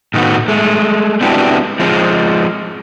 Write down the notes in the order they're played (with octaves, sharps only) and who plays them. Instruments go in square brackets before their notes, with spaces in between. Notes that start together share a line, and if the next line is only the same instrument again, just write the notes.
[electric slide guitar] A2 D#3 A3 B3 F#4
G#3 A3
B3 C4 D4 E4 F#4 G4
F3 G#3 C4